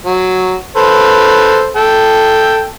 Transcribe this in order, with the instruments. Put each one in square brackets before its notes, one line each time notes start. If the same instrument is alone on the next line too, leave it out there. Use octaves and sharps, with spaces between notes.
[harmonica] F#3
A4 B4 C5
A4 G5